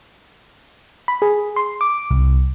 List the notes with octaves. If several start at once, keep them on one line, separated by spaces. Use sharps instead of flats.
B5
G#4
C6
D6
C2